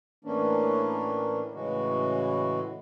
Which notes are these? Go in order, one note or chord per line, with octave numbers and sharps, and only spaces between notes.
A2 E3 A#3 C#4 D4
A2 C#3 E3 G#3 F#4